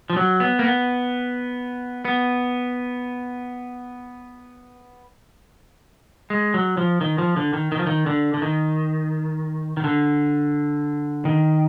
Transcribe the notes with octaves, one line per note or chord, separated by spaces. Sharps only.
F3
F#3
B3
A#3
B3
B3
G#3
F#3
F3
D#3
F3
D3
D#3
D#3
F3
D#3
D3
D3
D#3
D#3
D3
D#3